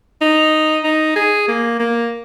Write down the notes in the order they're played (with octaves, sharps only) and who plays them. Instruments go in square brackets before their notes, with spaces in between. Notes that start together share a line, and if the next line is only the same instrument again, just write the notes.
[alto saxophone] D#4
D#4
G#4
A#3
A#3